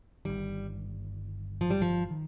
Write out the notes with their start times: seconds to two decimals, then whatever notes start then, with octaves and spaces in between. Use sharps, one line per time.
0.25 G1 G2 D#3 G3
1.61 F3
1.70 G3
1.82 F3
2.11 D#3